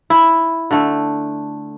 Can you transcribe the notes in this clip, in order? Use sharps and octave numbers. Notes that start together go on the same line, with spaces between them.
E4
D3 A3